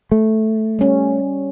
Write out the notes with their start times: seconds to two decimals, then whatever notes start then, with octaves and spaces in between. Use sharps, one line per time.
0.12 A3
0.79 G3 C#4